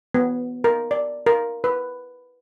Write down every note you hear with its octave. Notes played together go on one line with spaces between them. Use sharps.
B3
A#4
D5
A#4
B4